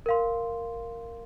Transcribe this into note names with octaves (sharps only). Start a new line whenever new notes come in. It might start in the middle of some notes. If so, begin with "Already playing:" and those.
A#4 F5 C6